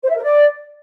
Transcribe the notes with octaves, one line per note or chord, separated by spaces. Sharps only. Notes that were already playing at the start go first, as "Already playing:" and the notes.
C5
E5
A#4
D5